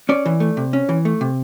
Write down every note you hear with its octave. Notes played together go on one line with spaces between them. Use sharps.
C#4 D5
E3
A3
C3
C#4
E3
A3
C3